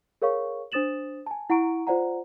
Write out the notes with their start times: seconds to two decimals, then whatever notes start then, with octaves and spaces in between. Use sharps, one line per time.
0.22 G#4 A#4 C#5 F5 C#6
0.72 D4 C5 D#6 A6 E7 F#7
1.26 G#5 A5
1.50 E4 F#5 A#5 C#6 D7
1.87 F4 C5 D5 F#5 A#5